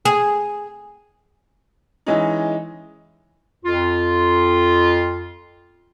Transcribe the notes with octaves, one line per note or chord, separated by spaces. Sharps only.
G#4
E3 G#3 C#4 D#4
F2 F4